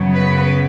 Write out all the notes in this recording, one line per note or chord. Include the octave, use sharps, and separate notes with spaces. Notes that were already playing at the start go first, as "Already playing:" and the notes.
Already playing: F#2 C#3 F#3 B3
B4